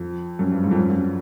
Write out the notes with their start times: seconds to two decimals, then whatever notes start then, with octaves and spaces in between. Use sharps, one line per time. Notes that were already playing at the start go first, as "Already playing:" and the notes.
Already playing: F2
0.39 F#2
0.52 G2
0.64 G#2
0.71 F2
0.77 F#2
0.89 F#2